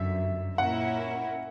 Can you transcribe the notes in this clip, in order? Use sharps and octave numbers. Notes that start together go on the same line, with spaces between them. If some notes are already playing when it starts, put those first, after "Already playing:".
Already playing: G1 F#2 D3 E5
A#2 A#3 C#4 E4 A#4 F#5